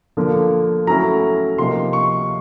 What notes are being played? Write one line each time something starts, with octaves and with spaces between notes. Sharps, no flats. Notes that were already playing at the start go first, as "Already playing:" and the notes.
D3 F3 A#3
F#3 A3 C#4 E4 A#5
C3 F3 A#3 D#4 C6
C#6